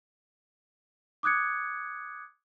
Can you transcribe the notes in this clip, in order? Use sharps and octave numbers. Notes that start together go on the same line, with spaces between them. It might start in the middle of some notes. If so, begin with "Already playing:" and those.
D6 D#6 F#6 G#6 C#7